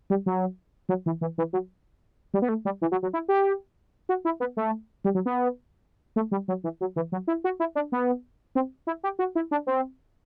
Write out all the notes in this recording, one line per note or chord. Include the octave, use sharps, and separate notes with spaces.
G3
F#3
F#3
E3
E3
E3
F#3
G3
B3
A3
G3
E3
F#3
F#3
E4
G4
F#4
E4
B3
A3
G3
F#3
B3
A3
G3
F#3
E3
F#3
E3
F#3
E4
F#4
E4
D4
B3
C4
E4
G4
F#4
E4
D4
C4